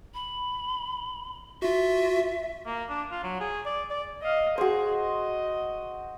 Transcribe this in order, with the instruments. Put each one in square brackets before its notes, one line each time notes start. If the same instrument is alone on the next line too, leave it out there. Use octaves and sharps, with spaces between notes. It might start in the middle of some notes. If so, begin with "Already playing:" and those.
[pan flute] B5
[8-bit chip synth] F4 F#4 [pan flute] E5
[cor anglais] A#3
D4
F4
F#3
G#4
D5
D5
[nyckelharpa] D#5 F5
[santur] F#4 C5 [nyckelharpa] G#4
[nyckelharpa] D#5